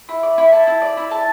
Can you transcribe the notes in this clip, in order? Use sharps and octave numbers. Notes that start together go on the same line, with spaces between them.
E4
D5
E4
A5
E4
D5
E4
A5